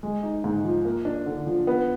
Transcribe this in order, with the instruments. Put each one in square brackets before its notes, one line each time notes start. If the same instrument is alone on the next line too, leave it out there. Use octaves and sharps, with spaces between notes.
[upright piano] G#3
D#4
G#2
F3
A#3
D4
D3
F3
B3